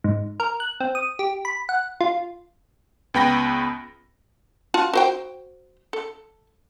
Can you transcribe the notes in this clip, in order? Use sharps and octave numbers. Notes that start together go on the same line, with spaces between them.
G#2
A#4
F#6
C4
D#6
G4
B5
F#5
F4
C#2 B3 G5 B5 A#6
F4 F#4 A5
F#4 C5 G5
A4